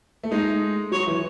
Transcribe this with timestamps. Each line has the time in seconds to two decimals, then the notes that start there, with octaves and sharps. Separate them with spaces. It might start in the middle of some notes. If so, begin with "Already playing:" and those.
0.24 A3
0.31 G#3 D#4
0.92 F#3 C#5
1.07 E3